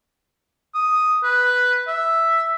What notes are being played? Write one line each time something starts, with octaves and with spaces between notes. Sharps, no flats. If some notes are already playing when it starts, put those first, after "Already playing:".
D#6
B4
E5